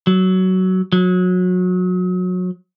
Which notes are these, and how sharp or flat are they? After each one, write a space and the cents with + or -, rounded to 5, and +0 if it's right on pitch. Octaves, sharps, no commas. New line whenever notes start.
F#3 +15
F#3 -25